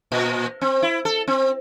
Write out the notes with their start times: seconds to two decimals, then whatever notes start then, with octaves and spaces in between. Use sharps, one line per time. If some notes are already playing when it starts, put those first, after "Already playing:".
0.12 A#2
0.61 C4
0.82 E4
1.05 A4
1.27 C4